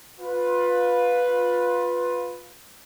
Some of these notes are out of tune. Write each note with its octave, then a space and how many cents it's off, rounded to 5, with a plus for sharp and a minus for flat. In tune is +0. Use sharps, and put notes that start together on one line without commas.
F4 +20 B4 +0